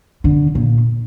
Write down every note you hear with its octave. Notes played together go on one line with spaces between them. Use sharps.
D3
A#2